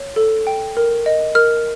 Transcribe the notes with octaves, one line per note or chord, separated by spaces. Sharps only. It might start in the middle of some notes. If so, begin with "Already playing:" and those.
Already playing: C#5
A4
G5
A#4
D#5
A#4 F6